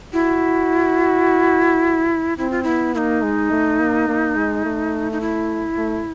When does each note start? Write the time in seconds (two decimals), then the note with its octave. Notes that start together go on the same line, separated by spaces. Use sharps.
0.13 E4 F#4
2.38 C4 E4
2.51 F4
2.63 B3 E4
2.94 A#3 D#4 E4
3.23 G#3
3.51 A3
3.79 A#3
4.08 A#3
4.36 G#3
4.65 A3
5.12 D#4
5.21 E4
5.77 A3